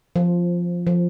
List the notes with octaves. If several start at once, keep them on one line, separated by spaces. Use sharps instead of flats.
F3
F3